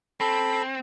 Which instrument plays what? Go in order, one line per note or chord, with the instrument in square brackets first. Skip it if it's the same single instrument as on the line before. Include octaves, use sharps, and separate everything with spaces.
[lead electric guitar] C4 [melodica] A4 B5